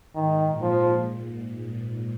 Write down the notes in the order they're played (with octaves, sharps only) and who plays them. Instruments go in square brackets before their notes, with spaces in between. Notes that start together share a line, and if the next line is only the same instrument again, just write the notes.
[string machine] G#2 [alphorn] D#3
[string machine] A#2
[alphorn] F3
[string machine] G#2